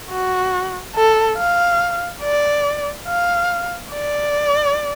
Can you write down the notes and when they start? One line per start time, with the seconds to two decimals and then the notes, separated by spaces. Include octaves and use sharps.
0.11 F#4
0.95 A4
1.38 F5
2.22 D5
3.07 F5
3.93 D5